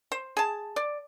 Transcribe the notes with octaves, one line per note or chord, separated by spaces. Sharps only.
C5
G#4 A5
D5